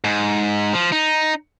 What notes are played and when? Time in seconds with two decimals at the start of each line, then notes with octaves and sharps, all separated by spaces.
0.04 G#2
0.73 F3
0.92 D#4